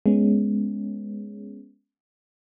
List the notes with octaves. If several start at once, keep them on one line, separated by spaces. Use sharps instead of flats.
G#3 B3 C#4